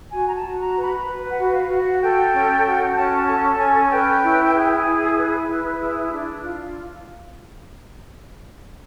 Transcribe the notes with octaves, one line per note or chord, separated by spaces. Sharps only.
F#4 G#5
A#5
A5
F#4
A#5
B4
B5
B4
F#5
F#4
F5
F#4
F#5
A4 G5
C#4
F#4
C#4 A5
G#5
A4 A5
C#4 G#5
B4 G5
E4
G#4
E4
B4
E4
G#4
D4
F4